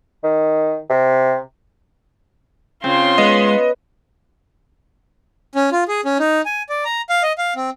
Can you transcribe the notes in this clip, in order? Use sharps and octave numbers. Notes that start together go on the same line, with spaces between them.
D#3
C3
C#3 C4 F4 C6
G#3 B3 D#5
C#4
F4
G#4
C#4
D#4
G#5
D5
A#5
F5
D#5
F5
C4